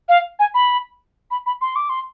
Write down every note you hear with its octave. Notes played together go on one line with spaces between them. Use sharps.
F5
G#5
B5
B5
B5
C6
D6
C6